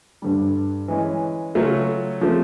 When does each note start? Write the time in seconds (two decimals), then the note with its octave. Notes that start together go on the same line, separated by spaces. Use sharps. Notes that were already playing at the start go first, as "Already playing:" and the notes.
0.22 G2 D3 G3
0.88 E3 G#3 C#4
1.55 C#3 F#3 A3 C#4 F4
2.21 F3 A3 C4